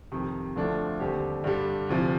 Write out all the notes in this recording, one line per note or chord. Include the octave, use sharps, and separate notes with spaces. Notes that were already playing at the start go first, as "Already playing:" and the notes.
F2 C3 D#3
D2 D3 F3 A3 D4
D#2 D3 G3 C4 G4
G2 D3 G3 D4
D2 C3 F3